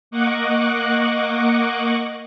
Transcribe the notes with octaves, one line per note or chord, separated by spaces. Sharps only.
A#3 D#5 F#5 C#6 D6 F#6